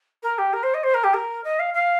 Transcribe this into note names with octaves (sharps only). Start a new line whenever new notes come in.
A#4
G4
A#4
C5
D#5
C5
A#4
G4
A#4
D#5
F5
F5